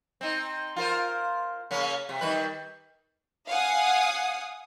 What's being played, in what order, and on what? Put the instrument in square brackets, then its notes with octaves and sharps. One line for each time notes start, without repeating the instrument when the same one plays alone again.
[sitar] C4 D#4
F4 A#4 C5
C#3 A#3 C#4
C3
D#3 G3 B4
[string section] F5 F#5 G#5 D#6